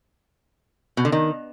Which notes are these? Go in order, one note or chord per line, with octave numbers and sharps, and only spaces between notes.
B2
D3
D#3